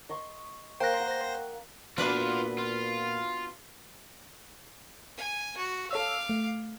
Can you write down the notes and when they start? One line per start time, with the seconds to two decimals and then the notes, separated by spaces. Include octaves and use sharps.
0.09 D#5 C6 C#6
0.80 A#3 C5 G5 F#6 A#6
1.00 F#5
1.98 A#2 B3 D4 F4 F#4 B4 D5 E5
2.58 F4
5.17 G#5
5.57 F#4
5.91 A4 C#5 F5 D6 E6
6.29 A3